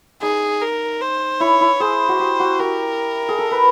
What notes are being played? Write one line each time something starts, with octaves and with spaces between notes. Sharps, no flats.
D#4 G#4
A#4
C5
E4 C#5
E4
G#4 C5
F#4
G4
F#4
G4 A#4
G#4
A4
B4